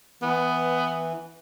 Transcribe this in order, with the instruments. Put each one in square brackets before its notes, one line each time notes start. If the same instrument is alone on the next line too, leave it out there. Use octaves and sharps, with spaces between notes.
[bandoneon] E3 [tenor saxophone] B3